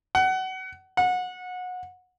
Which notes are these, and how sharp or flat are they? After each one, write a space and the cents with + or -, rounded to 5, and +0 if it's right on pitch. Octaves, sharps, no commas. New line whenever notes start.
F#5 +25
F#5 -25